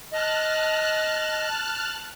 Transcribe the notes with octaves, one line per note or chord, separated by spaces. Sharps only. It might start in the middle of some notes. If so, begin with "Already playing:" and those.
D#5 A5 F6 F#6